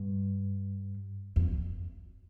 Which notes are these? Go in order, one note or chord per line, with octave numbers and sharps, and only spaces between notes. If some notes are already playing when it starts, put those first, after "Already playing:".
Already playing: G2
F2